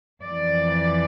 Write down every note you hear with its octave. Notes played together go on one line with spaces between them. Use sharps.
F2 E3 D5